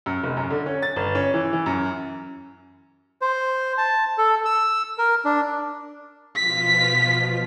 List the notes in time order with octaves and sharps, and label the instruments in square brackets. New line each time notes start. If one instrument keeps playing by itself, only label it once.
[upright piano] F#2
F1
F#2
D3
C#4
A6
G1
C#4
E3
E3
F#2
[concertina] C5
A5
A4
E6
A#4
D4
[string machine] B2 F3 F4 [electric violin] B6